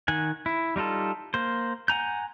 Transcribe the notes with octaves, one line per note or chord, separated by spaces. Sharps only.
D#3 F#5 G#5
E4
G3 D#4 F4 A4
A#3 C5
F#5 G#5 A#5 G6